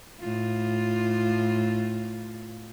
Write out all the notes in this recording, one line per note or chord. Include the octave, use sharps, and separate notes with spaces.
A2 F4